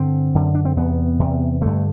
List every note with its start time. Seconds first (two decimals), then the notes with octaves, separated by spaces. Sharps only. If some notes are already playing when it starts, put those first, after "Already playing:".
Already playing: G2 D3 C4
0.34 F#2 D3
0.55 D4
0.65 C4
0.77 E2 C3 B3
1.19 E2 C3
1.61 G2 D3 A3